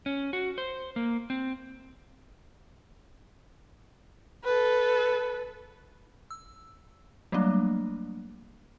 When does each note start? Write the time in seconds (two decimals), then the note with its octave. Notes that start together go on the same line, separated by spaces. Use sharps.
0.06 C#4
0.33 F#4
0.58 C5
0.96 A#3
1.30 C4
4.44 A4 B4
6.31 E6
7.32 F#3 G3 A3 A#3 D4